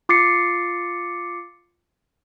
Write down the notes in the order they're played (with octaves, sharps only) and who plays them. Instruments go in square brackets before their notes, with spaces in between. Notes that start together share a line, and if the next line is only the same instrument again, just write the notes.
[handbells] F4 D6 A6 C7 C#7